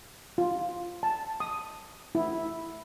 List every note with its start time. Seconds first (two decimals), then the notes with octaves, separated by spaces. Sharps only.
0.38 F4
1.03 A5
1.40 D#6
2.15 E4